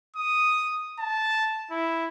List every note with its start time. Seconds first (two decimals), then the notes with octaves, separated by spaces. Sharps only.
0.16 D#6
0.99 A5
1.71 E4